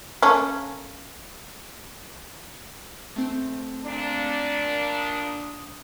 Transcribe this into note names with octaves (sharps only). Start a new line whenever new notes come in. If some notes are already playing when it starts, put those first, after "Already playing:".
A3 A#3 C#4
A3 C4
A#2 D4
D#6